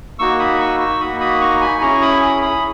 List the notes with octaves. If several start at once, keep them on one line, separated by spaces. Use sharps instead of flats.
A#3 D#4 F#4 C#6 E6
B5 D#6
C#6 E6
C#6 E6
A#3 D#4 F#4 B5 D#6
B5 D#6
A#5 C#6
G#5 B5
C#4 E4 G#4 A#5 C#6
B5 D#6
B5 D#6
B5 D#6